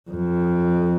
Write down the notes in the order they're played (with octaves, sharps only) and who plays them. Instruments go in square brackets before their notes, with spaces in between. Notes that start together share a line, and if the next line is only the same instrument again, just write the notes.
[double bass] F2